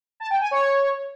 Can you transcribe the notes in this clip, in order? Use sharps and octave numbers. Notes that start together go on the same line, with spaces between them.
A5
G5
G#5
C#5